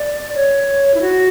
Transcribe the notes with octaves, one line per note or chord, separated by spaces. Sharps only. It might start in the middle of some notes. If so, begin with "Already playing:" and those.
Already playing: D5
C#5
E4
F#4